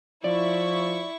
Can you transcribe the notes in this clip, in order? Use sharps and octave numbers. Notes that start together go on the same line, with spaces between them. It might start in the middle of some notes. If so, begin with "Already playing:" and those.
F3 E4 D5 C#6